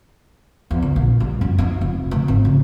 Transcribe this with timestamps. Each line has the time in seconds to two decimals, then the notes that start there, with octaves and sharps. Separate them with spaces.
0.71 E2
0.82 D3
0.96 A#1
1.20 G3
1.41 F#2
1.58 D#4
1.81 F1
2.11 D2
2.28 G#1
2.45 C#3